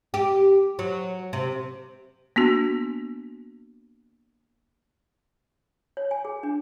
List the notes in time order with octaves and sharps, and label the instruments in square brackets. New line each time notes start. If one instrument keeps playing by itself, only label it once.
[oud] G4
F#3
C3
[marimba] A#3 B3 D4 F#4
[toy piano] C#5
G#5
G#4
D4